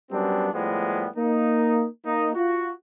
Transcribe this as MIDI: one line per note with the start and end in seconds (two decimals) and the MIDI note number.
0.12 0.48 42
0.12 0.48 55
0.12 0.48 59
0.12 0.48 60
0.12 0.48 62
0.52 1.07 45
0.52 1.07 53
0.52 1.07 55
0.52 1.07 56
0.52 1.07 59
1.17 1.87 58
1.17 1.87 63
2.05 2.29 58
2.05 2.29 63
2.35 2.70 65
2.35 2.70 66